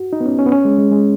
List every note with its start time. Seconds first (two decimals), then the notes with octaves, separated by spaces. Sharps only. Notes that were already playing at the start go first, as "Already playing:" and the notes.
Already playing: F#4
0.13 D#4
0.20 B3
0.26 C#4
0.39 C#4
0.46 B3
0.52 C#4
0.65 G#3
0.78 G#3
0.91 G#3